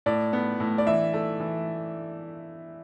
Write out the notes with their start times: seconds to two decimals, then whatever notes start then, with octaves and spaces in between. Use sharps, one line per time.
0.06 A2 D5
0.33 B3
0.60 A2
0.78 D5
0.87 E3 E5
1.14 A3
1.40 E3